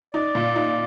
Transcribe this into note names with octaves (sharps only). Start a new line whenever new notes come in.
D#4 D5
A#2
D#4